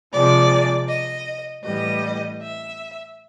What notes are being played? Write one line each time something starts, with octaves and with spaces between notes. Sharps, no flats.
C3 F3 G#3 D5
D#5
A2 E3 G3 B3 D#5
E5